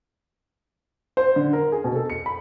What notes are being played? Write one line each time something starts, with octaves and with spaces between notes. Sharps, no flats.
C5
D3
A#4
G#4
B2
A4
C#7
B5